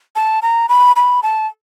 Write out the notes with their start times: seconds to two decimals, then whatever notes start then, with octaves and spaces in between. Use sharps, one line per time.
0.16 A5
0.42 A#5
0.69 B5
0.96 B5
1.23 A5